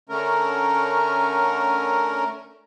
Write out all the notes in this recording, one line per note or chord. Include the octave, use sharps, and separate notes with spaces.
D3 A3 C#4 A#4